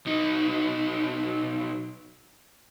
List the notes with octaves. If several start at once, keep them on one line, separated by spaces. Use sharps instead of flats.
B1 D#4